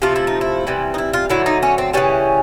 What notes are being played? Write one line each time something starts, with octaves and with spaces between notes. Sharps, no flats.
C3 F3 A3 F4
E4
D#4
E4
C3 E3 G3
D#4
E4
F4
D3 F#3 A3 E4
D#4
C#4
C4
C#3 E3 G3 C#4